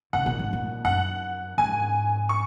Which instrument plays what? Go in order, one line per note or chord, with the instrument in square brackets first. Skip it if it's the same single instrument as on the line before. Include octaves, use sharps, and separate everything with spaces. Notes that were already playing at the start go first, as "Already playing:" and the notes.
[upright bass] C#3 [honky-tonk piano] F#5
[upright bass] A#2
G#2
A#2
[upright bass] F#2 [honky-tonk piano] F#5
[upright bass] G#2 [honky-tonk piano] G#5
[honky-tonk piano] C#6